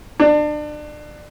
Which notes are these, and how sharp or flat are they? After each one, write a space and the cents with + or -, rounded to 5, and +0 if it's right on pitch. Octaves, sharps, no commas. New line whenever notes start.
D4 +30